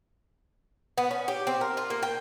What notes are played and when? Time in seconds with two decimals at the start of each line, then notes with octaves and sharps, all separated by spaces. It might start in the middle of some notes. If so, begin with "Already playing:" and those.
0.98 B3
1.11 C#4
1.28 G4
1.47 C4
1.61 A#4
1.77 F4
1.90 A#3
2.03 G5